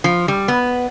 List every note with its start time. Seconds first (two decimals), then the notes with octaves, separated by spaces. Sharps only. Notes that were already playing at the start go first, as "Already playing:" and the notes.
0.04 F3
0.28 G3
0.48 B3